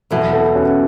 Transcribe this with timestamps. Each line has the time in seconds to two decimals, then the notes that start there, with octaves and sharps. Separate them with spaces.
0.11 E2 B2 F#3 E4 A4
0.33 E4 A4
0.54 C#4 F#4